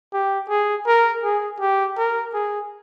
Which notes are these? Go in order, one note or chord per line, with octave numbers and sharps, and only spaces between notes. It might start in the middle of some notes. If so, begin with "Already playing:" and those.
G4
G#4
A#4
G#4
G4
A#4
G#4